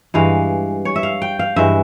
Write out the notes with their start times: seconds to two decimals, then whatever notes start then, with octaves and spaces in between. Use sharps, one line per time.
0.14 G2 E3 G#3 F5
0.85 C#5
0.96 E5
1.03 F5
1.22 G5
1.39 F5
1.56 G2 E3 G#3 E5